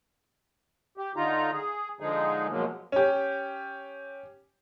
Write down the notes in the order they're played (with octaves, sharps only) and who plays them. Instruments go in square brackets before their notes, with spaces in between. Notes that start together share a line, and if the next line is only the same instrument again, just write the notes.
[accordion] G4
D3 D#4 F4 A#5
G#4
D3 F3 G#3 D#4 G#4
B2 F3 F#3 G#3 A#3
[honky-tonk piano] C#4 G4